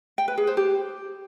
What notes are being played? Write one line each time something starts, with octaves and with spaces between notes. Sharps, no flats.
G5
B4
G#4
C5
G4